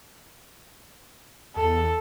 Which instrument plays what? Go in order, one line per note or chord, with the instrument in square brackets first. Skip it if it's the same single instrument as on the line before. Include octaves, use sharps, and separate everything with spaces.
[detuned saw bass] E2 [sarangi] A4